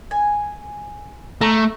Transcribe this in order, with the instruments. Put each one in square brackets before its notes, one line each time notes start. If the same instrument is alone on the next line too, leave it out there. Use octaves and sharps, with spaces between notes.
[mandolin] G#5
[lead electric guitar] A3 [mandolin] A#5